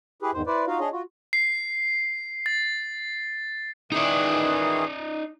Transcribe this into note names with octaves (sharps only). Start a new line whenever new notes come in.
E4 G4 G#4 B4
E2 G#2 D#3 C5
E4 B4 C5 D5
D#4 F4 F#4 F5
D4 G#4 C#5 D#5
F4 F#4
C7
A6
D#3 E3 D#4 G#4 D5